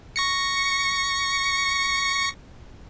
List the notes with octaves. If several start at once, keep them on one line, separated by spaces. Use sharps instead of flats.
C#6 A#6 C#7